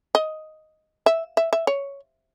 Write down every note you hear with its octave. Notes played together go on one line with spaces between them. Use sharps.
D#5
E5
E5
E5
C#5